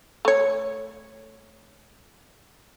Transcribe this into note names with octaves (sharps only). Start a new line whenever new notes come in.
A3 C#5